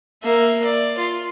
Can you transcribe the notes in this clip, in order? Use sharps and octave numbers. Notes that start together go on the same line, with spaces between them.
A#3 E5
D5
F4